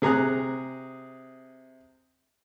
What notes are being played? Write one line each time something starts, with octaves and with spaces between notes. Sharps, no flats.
C3 G#4 A#5 D#6 F#6